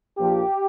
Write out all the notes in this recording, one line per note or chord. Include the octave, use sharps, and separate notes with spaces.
A#1 A#2 F3 G4